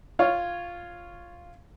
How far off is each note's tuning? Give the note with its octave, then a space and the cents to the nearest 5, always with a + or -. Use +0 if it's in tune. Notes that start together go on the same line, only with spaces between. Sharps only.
F4 +0 C#5 +0 F5 +0